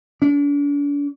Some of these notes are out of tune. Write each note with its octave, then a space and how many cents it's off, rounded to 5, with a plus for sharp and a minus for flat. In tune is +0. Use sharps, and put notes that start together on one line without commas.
D4 -40